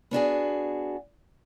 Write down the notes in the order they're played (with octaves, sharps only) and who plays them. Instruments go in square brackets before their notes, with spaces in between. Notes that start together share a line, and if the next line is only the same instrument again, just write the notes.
[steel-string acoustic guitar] B3 D4 F#4 G#4